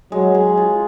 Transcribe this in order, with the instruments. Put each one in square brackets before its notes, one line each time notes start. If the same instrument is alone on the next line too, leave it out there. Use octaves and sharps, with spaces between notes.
[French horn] F#3 [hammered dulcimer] G#3
[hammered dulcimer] G#4
F4